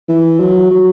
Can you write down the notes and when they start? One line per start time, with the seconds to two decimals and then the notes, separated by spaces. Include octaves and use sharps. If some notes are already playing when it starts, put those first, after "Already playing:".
0.09 E3
0.40 F#3
0.71 F#3